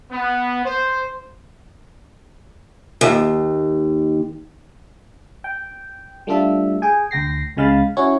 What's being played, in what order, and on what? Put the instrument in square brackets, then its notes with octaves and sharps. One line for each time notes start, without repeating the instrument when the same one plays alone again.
[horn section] B3
C5
[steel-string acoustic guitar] D#2
[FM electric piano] G5
G3 A3 D4 F4 A4 E5
G#4 G5 G#5
D2 G5 A#6 C7
C#2 C#3 G#3 F5 B5 A6
C#4 E4 F#4 C#5